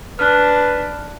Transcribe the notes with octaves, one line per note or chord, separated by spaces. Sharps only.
D4 B4 F6 F#6